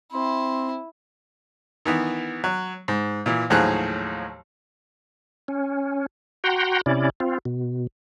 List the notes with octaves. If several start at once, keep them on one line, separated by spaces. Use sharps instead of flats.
C4 E4 C6
D#3 E3 B3
F#3
G#2
A#2 E3
D#2 A2 F3 F#3 G#4 F#6
C#4
F#4 F#5 G5 A#5 C6
C3 C#4 E4 D5
C4 F4
B2